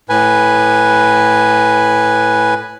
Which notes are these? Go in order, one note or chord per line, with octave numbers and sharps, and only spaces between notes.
A2 B4 G#5